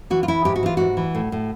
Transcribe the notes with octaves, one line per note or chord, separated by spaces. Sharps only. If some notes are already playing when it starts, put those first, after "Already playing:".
E3 F#4
F4
E3 E4
G#2 G4
F#4
E3 F4
G#2 F#4
E3
A2
A2